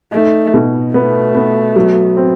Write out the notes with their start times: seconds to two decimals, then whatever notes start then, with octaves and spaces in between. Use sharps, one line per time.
0.12 A3 D#4
0.54 B2
0.94 A3 B3
1.35 B3
1.76 F#3
2.17 C4